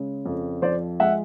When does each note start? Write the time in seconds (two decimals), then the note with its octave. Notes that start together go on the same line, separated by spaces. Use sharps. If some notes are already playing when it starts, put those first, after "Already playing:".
Already playing: C#3 G#3
0.26 F2
0.62 F3 C5 D5
1.00 G#3 E5 F#5